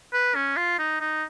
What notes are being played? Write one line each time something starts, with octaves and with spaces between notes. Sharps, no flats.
B4
C#4
F4
D#4
D#4